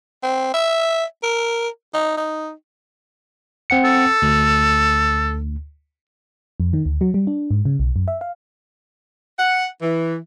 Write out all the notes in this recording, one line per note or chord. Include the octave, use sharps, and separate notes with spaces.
C4
E5
A#4
D#4
D#4
C4 F#5 C#7
A4
D2
F2
D#3
D2
F#3
G3
D4
G#2
C#3
B1
F#2
E5
F5
F#5
E3